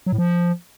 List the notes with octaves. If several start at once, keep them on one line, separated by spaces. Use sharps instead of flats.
F#3
A2
F3